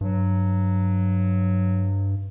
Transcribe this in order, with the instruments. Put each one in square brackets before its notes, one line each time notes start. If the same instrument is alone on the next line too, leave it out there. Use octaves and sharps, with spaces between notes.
[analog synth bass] G2 [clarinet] F#3